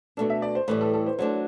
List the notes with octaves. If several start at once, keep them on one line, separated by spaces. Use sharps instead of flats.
B2 A3 D4 A4
E5
D5
C5
A2 E3 G3 B4
A4
A4
C5
F#3 A3 D4 C5